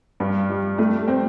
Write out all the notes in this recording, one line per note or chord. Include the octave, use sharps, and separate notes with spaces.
G2
G3
A3
C4